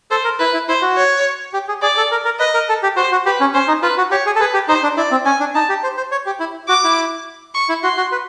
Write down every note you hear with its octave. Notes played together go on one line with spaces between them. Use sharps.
A4 C5
A#4
E4 B4
E4
E4 C5
F#4
C#5
G4
G#4
G#4 D5
A4
A#4
A#4
B4 D#5
A#4
A4
G4
F#4 C5
F#4
G4 B4
C#4
C#4 C5
D#4
F4 B4
F#4
G4 C#5
G#4
A4
G#4 B4
G4
D#4 C5
D4
E4 D5
C4
C#4 G#5
D4
D#4 A5
G4
C5
C5
C#5
G4
E4
F#4 D6
E4
C#6
E4
F#4 C6
F#4
B4